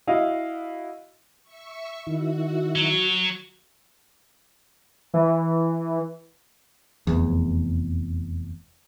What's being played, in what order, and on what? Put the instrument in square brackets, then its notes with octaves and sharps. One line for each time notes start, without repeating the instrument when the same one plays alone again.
[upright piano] E4 F#4 D#5 F5
[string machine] E5 C#6
[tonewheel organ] D#3 E4 [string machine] F#4
[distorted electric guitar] F#3
[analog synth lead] E3
[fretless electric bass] F1 E2